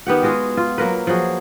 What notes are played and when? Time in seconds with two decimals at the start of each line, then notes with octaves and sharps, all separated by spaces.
0.07 D#3 B3 G4 F#5
0.23 G#3 F4 F#4 G#4
0.57 F4
0.78 F#3 A#3 A#4 B4
1.07 F3 F#3 F#4 G#4